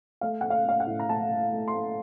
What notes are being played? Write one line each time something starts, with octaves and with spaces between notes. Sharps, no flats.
A3 F5
A3 F#5
F5
A3 F5
F#5
A2
A#5
A3 A5
A3
A3
C6
A3